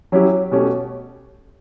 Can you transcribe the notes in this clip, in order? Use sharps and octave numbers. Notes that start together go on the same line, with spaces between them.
F#3 C#4 E4 G4
B2 A3 C#4 G4